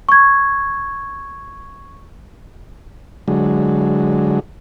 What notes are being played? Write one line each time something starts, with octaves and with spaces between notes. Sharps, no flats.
C#6 G#6
D3 F#3 G#3